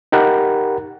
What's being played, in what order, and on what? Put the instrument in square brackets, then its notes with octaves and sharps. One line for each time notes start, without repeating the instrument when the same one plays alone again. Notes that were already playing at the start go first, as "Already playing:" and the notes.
[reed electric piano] D#4 G4 A#4 F#5 B5